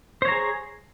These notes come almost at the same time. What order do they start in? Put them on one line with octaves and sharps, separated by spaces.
C5 C#5 A#5 G#4